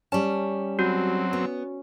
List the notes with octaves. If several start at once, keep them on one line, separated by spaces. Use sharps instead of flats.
G3 C#4 A5
F#3 C4 F#4
B3